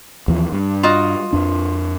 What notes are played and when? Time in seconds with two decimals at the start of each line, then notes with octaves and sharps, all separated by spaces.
0.28 D#2 E3 F3
0.52 G2
0.83 F4 F#4 D#5
1.33 F2 D4